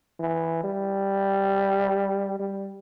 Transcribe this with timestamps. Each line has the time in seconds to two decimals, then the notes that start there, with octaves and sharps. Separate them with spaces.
0.20 E3
0.64 G3
2.39 G3